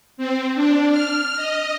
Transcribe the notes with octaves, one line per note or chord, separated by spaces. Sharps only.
C4
D4
F6
D#5